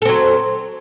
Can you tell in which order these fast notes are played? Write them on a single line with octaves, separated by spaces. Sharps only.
A4 C4 F#3